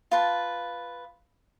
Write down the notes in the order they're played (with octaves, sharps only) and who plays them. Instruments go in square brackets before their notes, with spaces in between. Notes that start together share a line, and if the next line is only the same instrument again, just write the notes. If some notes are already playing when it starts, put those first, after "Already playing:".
[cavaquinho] F4 B4 A5